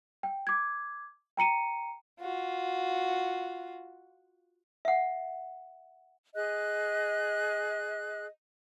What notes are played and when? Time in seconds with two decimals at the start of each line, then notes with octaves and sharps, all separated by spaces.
0.23 G5
0.47 D6 G#6
1.37 G5 A#5 C#7 D#7
2.20 F4 F#4
4.85 E5 F#5
6.35 G#4 D#5 F#6